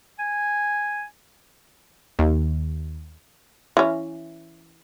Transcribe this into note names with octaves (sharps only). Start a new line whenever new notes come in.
G#5
D#2
E3 C#4